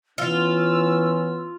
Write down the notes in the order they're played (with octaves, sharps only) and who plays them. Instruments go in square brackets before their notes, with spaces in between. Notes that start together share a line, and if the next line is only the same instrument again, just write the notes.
[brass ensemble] E3 B3 C#4 [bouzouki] F4 [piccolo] E6